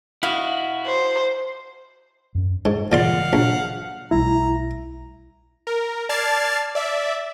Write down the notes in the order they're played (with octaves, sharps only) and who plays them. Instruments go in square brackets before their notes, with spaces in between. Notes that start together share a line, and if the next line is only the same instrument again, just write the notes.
[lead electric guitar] E4 F#4 [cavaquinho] D#5 F5
[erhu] C5
[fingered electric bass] F#2 C#4
[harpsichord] G#2 [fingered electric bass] G#3
[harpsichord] A#2 D5 C6 [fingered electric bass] C#3 E3 G3 [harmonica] F5 F#5
[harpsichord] A#1
[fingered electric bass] B1 G3 A3 [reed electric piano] E4 [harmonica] A#5
[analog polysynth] A#4
D5 A5 F6 G#6 A6 C7
D5 E5